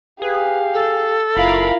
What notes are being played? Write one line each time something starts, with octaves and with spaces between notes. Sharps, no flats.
G4 G#4 B4 F5
A4
F#1 E4 F4 A#4 F5 B5